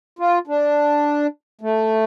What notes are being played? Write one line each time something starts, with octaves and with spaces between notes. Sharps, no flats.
F4
D4
A3